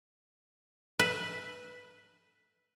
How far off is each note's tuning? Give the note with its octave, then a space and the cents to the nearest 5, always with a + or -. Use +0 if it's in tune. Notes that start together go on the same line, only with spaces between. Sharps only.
B4 +0 E5 +0